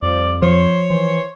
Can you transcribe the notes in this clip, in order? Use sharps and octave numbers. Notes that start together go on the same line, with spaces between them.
F2 F3 G3 D5
F3 C5 C#5
E3 C5